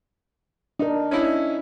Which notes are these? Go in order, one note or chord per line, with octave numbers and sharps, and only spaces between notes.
D4 D#4 A#4
C#4 D#4 E4